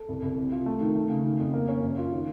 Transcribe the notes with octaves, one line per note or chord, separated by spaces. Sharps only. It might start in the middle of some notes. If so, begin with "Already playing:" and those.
Already playing: A4
C2
C2
C3
F4
A3
D#3
A3
C#3
D#3
F2
A#3
C#4
F#2
F4
D#3